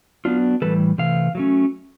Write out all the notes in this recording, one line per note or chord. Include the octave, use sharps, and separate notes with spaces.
F#3 B3 D4 F4
A2 E3 G3 A4 B4
C3 E3 A3 F5
F#3 A3 C#4